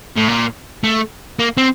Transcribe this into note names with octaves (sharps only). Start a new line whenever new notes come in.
A2
A#2
A3
A#3
C4